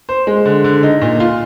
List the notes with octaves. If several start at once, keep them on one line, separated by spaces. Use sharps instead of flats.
C5
G#3
D3
D3
D#4
A#2
F4